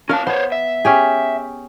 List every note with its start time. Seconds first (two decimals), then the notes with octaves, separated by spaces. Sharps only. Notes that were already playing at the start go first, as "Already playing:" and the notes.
0.09 C#4 A#4 F5 A5
0.27 B3 C5 C#5
0.52 E5
0.85 C#4 G4 G#4